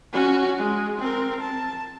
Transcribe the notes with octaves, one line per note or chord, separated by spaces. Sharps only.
C#4 F#4
G#3
C4 A#4
A5